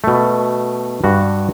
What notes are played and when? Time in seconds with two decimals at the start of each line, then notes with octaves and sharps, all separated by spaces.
0.04 B2 A3
1.04 G2 F#4